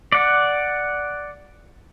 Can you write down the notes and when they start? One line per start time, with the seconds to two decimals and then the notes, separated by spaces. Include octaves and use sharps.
0.12 D5 F#5